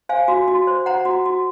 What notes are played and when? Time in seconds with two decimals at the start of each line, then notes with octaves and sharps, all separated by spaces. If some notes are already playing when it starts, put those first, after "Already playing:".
0.09 C5 F5 G#5
0.28 F#4
0.48 F#4
0.67 C5
0.86 C5 F#5 A#5
1.05 F#4
1.26 F#4